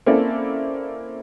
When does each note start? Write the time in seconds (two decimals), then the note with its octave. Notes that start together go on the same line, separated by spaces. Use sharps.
0.06 A#3 C4 C#4 E4 A4 D5